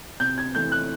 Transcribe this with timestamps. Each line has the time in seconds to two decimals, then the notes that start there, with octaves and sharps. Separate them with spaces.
0.20 C3 G6
0.38 G#6
0.55 E3 A3 G6
0.72 F#6